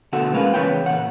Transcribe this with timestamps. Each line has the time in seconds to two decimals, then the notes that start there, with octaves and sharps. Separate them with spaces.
0.13 B2 D3 F#4 A4 F#5
0.33 G#3 A#3 C#4 F4 B4
0.54 E2 C#3 F3 B4 C#5 G5
0.86 A#2 F#5